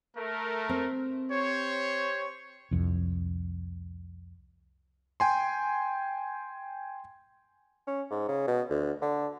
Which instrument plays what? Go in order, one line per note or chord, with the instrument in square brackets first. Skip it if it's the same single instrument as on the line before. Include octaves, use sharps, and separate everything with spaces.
[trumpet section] A3 A#4
[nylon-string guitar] C4
[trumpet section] G4 C5 C#5
[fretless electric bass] C2 F2
[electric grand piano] G5 G#5 C6
[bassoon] C#4
G#2
C#3
B2
D2
D3